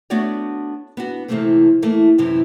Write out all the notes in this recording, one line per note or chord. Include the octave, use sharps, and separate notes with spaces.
A3 B3 D4 F#4 C#5 D5
B3 D4 F#4
C3 E3 F3 A3 A#3 C4
E3 A3 A#3 E4
F#2 C3 E3